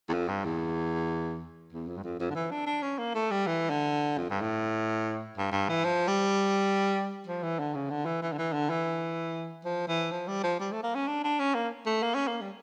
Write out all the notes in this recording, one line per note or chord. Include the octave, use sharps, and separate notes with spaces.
E2
F2
G2
E2
E2
F2
G2
F2
F2
D3
E3
D4
D4
C#4
A#3
A3
G3
E3
D3
F2
G2
A2
G2
G2
E3
F3
G3
F3
E3
D3
C#3
D3
E3
E3
D3
E3
D3
E3
F3
E3
F3
G3
F3
G3
A3
A#3
C#4
D4
D4
C#4
A#3
A3
A#3
C#4
A#3
G3